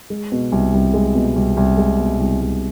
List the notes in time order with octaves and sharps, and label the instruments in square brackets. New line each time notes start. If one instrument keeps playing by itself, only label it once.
[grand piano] G#3
B2
C2
C2
G#3
B2
C2
C2
G#3
B2
C2
C2